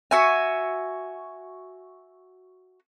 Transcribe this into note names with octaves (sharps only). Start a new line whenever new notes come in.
F#4 E5 G#5